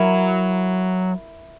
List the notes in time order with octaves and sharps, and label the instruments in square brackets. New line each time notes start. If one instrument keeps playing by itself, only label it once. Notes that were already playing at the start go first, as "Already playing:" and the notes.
Already playing: [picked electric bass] F#3 [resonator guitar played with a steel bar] E4 A#4